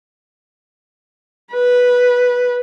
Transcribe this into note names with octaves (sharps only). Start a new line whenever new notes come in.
B4